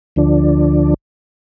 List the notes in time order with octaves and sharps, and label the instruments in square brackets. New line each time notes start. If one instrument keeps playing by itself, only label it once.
[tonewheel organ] D2 D3 F3 D4